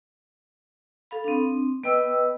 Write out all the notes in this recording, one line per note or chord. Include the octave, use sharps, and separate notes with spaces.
A4 F5 B5
C4 D4
B3 B4 D#5 G5 E6